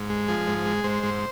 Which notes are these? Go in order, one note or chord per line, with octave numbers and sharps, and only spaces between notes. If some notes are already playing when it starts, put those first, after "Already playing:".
Already playing: G#2
G#3
F3 G#4
G#2
G#3
G#2 C5
G#2